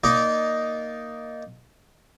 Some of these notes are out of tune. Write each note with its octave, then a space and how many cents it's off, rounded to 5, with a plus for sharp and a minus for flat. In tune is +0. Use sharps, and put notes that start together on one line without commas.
A#3 +0 D#4 +0 D5 -15